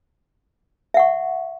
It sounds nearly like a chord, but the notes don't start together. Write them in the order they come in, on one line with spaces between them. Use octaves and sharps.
E5 F#5 C#6